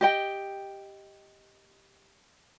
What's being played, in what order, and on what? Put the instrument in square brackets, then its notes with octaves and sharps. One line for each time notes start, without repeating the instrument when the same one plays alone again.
[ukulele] G4 D#5 G5